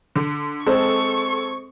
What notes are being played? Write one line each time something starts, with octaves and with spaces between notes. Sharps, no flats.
D3
G#3 C4 A4 C5 C#6